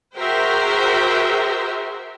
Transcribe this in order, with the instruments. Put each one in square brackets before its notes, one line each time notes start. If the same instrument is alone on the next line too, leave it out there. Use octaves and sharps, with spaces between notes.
[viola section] F#4 G#4 A#4 C5 E5 G5